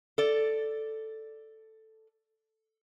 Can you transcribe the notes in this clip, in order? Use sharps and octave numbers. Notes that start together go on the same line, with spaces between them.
A4 D5